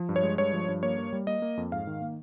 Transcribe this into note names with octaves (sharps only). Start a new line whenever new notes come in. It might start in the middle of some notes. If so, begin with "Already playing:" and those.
Already playing: F3
G2
C#5
G#3
G2 C#5
F3
G2
A#3 C#5
A#3
G3
A#3 D#5
A#3
F2
G#2 F5
D#3
A#3